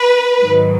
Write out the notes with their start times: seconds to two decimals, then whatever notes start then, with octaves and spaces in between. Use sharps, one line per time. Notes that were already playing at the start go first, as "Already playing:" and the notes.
Already playing: B4
0.41 G#2 D#3 F#3